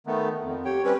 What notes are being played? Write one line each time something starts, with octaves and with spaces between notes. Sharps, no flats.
D#3 A3 B3
F2
G4 C#5 G5
G3 C4 C#4 B4